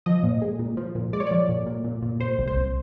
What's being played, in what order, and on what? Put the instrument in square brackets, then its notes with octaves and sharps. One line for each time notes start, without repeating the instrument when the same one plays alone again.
[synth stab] F3 D#5
A#2
G#3
A#2
F3
A#2
G#3 D5
C#5
F3 D5
A#2
A#2
A#2
A#2
A#2 C5
C2
C5
C2